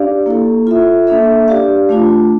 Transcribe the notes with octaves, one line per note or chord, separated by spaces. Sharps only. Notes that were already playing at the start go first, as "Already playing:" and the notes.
Already playing: D4 G4 D5 F5
A#3 E4 A4
F4 A4 E5
A#3 D4 A4 E5
D4 G4 D5 F5
A3 D4 F4